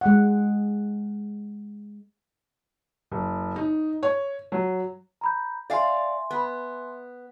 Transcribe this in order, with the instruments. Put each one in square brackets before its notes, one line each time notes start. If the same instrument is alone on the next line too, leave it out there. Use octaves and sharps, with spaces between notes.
[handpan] G#3 F#5
[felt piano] F#1
D#4
C#5
F#3
[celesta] A#5 B5 G6
[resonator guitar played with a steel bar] D5 F5 [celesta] E5 G#5 C6
[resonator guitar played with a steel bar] B3